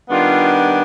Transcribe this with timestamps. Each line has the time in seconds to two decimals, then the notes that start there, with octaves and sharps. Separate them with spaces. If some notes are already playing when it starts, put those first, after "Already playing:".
0.10 D#3 G3 B3 D4 F4